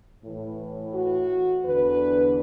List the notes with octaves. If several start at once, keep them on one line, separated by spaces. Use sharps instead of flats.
A2 E3
F#4
E2 D3 B4